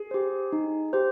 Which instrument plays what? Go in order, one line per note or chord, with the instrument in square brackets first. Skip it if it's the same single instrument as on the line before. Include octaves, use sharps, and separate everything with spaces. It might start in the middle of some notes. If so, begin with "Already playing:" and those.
Already playing: [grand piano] G#4
[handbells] G4 C5
D#4
G4 C5